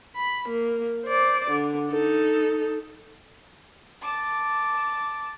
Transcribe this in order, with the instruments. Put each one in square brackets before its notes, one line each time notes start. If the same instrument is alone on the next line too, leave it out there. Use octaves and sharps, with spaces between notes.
[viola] B5
A#3
C5 D5
D3
D#4 A4
[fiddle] A5 D6